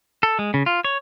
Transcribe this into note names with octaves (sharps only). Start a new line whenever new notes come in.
A4
G#3
C#3
F4
C#5